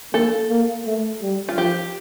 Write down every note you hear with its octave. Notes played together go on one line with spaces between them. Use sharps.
A#3 A4
A#3
A3
G3
F4
F3 G4